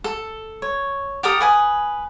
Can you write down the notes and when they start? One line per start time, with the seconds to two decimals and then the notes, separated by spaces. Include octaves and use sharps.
0.04 A4
0.62 C#5
1.23 G4 A4 A#4 D#6
1.40 B4 G#5 D#6